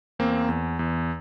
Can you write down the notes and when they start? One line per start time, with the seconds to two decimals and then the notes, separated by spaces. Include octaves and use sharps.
0.19 E2 A#3 C4
0.49 E2
0.79 E2